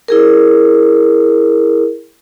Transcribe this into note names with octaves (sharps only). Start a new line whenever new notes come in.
E4 G#4 A#4